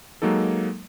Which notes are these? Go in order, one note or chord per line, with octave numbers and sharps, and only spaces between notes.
F#3 G#3 A#3 D#4 A4